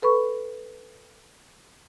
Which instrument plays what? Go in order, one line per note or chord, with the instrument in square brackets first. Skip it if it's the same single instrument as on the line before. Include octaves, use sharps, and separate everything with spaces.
[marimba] A4 B4 B5 C#6